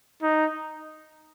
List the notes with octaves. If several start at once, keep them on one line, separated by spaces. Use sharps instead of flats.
D#4